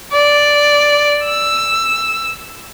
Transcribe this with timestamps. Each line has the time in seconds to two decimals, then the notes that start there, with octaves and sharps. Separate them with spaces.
0.12 D5
1.24 E6